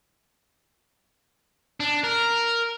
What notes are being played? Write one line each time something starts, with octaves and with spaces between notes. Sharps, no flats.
D4
A#4